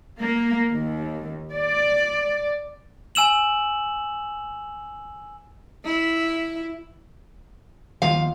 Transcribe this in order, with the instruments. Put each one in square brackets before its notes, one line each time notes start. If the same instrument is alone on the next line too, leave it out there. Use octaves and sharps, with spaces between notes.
[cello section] A#3
D#2
D5
[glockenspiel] G#5 E6 E7 F#7
[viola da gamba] E4
[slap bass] D#2 F3 [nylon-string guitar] F5